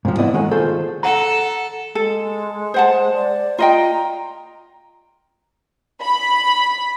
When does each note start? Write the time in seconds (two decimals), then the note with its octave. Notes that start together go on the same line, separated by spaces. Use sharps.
0.05 G#2 C3 F3
0.18 B3 C4 E4 B4 D5 D#5
0.34 D#3 G#3 A4 F#5 G#5
0.51 D#3 A3 F4 G#4 A4 C5
1.03 A4 F#5 A#5
1.95 G#3 A4
2.74 C5 F#5 A5
3.14 D5
3.58 F4 D#5 G5 A#5
6.01 B5